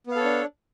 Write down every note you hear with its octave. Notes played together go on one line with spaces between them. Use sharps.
B3 D4 A4 C#5 F5